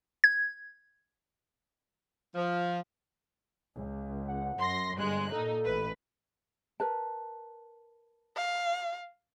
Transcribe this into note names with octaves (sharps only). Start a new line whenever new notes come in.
G#6
F3
C#2
F#5
F#2 C6 A#6
G1 G3 G#3 F#6
A#2 D#4 A4
A1 B4
A#4 B4 A5
F5